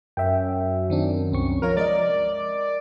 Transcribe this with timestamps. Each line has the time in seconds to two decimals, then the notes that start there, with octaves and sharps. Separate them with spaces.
0.17 F#2 E5 G5
0.90 D#3 C4 D4
1.32 C2 C4 C#6
1.62 F3 F4 A#4 C#5
1.77 G#3 A#4 D5 D#5